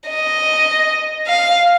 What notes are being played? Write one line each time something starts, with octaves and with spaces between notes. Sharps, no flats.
D#5
F5